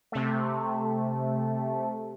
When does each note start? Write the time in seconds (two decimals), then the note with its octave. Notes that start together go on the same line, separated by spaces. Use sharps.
0.12 C3 A3